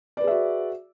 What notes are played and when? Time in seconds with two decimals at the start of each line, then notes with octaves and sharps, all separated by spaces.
0.17 D5
0.20 B4
0.24 G#4
0.27 E5
0.31 F#4